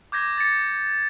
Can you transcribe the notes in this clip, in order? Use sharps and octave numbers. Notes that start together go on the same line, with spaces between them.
D6 G6 G#6 A#6
A6 C#7